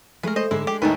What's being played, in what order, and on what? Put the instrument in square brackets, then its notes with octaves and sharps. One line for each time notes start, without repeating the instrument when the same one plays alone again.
[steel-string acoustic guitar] G#3 A3 G#4 [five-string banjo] A#4 B4
[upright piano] C5 [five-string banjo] D#5
[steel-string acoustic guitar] G#2 D3 [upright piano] G#3 [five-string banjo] E4
[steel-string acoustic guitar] D4 [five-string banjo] G4
[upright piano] D#2 A2 [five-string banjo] G#3 A4 B4 [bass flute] D#4